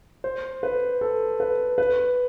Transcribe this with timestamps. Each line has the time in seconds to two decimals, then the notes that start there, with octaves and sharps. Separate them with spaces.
0.24 C5
0.63 B4
1.01 A4
1.40 B4
1.78 B4